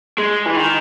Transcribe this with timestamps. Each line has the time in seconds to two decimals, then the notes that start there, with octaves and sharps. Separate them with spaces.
0.18 G#3
0.46 E3
0.57 D#3